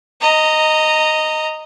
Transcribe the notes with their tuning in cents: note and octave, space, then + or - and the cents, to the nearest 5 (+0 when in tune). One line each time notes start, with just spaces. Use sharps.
D#5 +0 A#5 -15